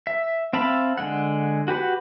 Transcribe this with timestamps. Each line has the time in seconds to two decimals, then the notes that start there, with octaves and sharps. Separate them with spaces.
0.07 E5
0.53 C4 E5 F5 A5 B5
0.98 D3 G#3 F#5
1.68 F#4 G4 B4 F#5